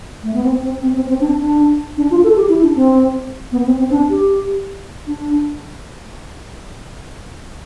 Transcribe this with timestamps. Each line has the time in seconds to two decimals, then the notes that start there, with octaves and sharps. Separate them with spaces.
0.23 A3
0.34 B3
0.44 C4
0.63 C4
0.82 C4
0.95 C4
1.08 C4
1.20 D4
1.40 D4
1.97 D4
2.11 F4
2.24 A4
2.36 G4
2.49 E4
2.63 D4
2.75 C4
3.52 B3
3.66 C4
3.79 C4
3.90 D4
4.10 G4
5.07 D4